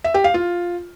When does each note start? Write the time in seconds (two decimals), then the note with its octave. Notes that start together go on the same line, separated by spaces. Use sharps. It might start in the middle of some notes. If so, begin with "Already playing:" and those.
0.04 E5
0.14 G4
0.24 F5
0.34 F4